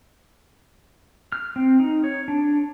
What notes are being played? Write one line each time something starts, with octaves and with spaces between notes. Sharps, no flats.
F6
C4
D#4
C#5
D4